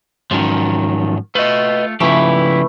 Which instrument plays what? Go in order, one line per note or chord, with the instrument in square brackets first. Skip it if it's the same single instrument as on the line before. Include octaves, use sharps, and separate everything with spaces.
[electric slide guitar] G#2 F#3 C#4 [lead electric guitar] D#3 F3
[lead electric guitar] A3 F4 [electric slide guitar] B4 D#5
[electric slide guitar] C#3 F3 [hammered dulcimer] E3 A3 B4 [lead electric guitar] E4 G4